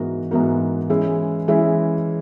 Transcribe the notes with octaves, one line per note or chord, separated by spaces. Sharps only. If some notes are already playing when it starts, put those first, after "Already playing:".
Already playing: G#2 E3 B3 F#4 A#4
G#2 E3 B3 F#4 A#4
E3 G#3 C#4 E4
E3 G#3 C#4 E4